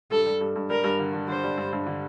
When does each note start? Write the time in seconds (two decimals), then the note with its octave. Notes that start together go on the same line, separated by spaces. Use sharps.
0.11 G2 A4
0.26 G3
0.41 G2
0.56 G2
0.70 G3 A#4
0.84 G2
0.99 D3
1.13 D3
1.28 D3 C5
1.44 G3
1.58 G2
1.73 G2
1.87 D3